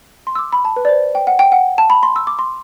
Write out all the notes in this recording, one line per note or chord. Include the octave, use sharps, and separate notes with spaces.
C6
E6
D6
B5
A5
B4
D5
C5
G5
F#5
G5
F#5
A5
B5
C6
E6
D6
C6